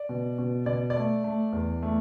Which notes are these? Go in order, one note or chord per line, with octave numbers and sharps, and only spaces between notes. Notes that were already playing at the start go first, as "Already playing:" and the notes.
Already playing: D5
B2
B2
B2 D5
D5
A3
A3
E2
A3